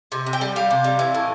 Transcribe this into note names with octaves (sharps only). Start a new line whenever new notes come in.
C3
C3
G5
G3
G3 F5
C3
G3
E3
A2